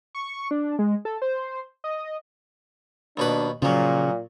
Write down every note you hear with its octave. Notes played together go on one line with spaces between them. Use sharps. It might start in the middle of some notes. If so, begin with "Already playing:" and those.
C#6
D4
G#3
A4
C5
D#5
D#2 B2 D4 B4
A#2 C#3 F3 F#3